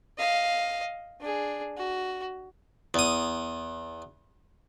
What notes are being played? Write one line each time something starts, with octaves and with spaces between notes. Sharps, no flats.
D#5 F5
D4 G#4
F#4
E2 D#6